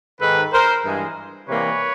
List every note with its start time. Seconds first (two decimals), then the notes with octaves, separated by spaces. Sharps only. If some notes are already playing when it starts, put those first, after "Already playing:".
0.21 G#2 D#3 G#3 A4 B4
0.53 A#4 C5
0.84 G2 E3 G#3
1.49 C3 E3 G3 A#3 B4 C#5